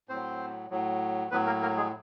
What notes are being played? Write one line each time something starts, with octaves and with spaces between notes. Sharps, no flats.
A2 F#3 C4 C5
A2 F#3
A2 F#3 B3 B4
A#3 A#4
A#3 A#4
G#3 G#4